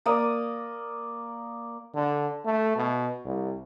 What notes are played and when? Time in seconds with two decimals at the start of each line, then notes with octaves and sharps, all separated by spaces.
0.06 A#3 D5 D#6
1.95 D3
2.45 A3
2.76 B2
3.25 C2